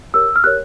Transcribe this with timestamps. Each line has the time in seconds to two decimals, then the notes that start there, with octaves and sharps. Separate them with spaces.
0.14 G4 A#4 C#5 E6
0.36 F6
0.44 G4 A#4 C#5 F#6